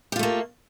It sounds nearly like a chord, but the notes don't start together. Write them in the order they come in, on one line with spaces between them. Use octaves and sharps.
G4 F4 A3 A#3